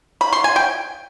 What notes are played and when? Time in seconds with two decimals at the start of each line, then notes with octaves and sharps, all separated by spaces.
0.21 B5
0.33 C6
0.44 G#5
0.56 G5